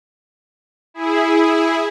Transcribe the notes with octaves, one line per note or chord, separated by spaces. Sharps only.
E4 G#4